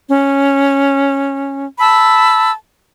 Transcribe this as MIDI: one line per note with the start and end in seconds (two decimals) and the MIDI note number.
0.09 1.66 61
1.79 2.51 81
1.79 2.51 83
1.79 2.51 88